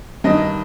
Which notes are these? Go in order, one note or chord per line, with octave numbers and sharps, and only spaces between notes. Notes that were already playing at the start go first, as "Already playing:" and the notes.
G2 D#3 D#5